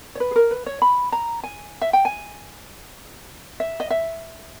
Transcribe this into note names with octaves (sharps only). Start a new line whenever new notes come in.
C#5
B4
G#4
A#4
B4
C#5
B5
A#5
G#5
E5
G5
G#5
E5
D#5
E5